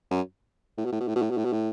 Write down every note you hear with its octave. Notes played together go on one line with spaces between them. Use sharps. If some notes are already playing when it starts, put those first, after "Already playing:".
F#2
A2
B2
A2
B2
A2
B2
A2
B2
A2
B2
A2